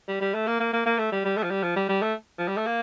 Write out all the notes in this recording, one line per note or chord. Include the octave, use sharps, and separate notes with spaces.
G3
G3
A3
A#3
A#3
A#3
A#3
A3
G3
G3
A3
F3
G3
F3
G3
G3
A3
F3
G3
A3
A#3